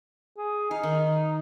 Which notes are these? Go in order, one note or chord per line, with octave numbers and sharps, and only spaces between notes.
G#4
D#4 F5
D#3